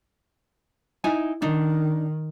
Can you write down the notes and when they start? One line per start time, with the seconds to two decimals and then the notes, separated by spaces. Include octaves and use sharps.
1.04 D#4 E4 G#5
1.42 D#3 D4 D#4